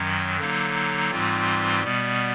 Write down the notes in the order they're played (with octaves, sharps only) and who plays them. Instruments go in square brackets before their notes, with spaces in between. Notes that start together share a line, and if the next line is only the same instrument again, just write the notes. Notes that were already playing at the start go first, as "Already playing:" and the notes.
Already playing: [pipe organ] F#2 D#3 F#3
D3 F#3 A#3 D#4
G#2 E3 G3 C4 F4
B2 G3 B3